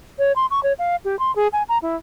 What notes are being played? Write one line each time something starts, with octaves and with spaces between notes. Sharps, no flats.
C#5
C6
C#6
C#5
F5
G4
C6
G#4
G#5
A#5
E4